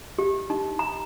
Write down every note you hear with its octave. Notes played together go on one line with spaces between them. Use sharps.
G4
D#4
A#5